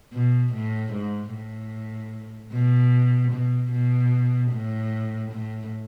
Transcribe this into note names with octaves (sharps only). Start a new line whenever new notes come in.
B2
A2
G#2
A2
B2
B2
B2
A2
A2